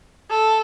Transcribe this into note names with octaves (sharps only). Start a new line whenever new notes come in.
A4